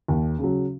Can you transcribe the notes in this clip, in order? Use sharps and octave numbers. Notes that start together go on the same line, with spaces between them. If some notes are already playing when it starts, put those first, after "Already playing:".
D#2
C#3 F#3